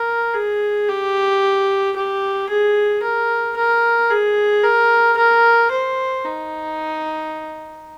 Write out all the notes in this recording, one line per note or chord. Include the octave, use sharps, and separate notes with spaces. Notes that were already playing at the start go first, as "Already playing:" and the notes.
Already playing: A#4
G#4
G4
G4
G#4
A#4
A#4
G#4
A#4
A#4
C5
D#4